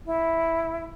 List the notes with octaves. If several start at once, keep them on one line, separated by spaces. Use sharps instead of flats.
E4